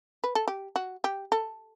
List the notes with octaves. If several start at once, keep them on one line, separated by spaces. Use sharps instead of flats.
B4
A4
G4
F#4
G4
A4